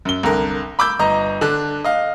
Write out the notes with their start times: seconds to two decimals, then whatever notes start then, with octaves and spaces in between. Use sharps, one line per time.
0.05 F#2 G7
0.23 C2 D3 A#4
0.79 B5 D6 E6 G6
0.99 G1 D#5 A#5
1.41 D3 D4
1.84 D#5 F5